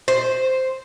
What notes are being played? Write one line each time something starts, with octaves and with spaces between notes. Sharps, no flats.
C5